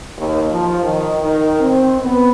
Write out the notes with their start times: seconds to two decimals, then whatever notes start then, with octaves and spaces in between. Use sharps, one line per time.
0.18 D#2
0.52 F3
0.83 D#3
1.21 D#3
1.60 C4
2.01 B3